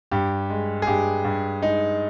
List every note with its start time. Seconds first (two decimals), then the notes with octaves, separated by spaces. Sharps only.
0.11 G2 G4
0.50 G#3
0.82 G#4
0.87 G2 G4
1.25 G2
1.62 G#3 D#4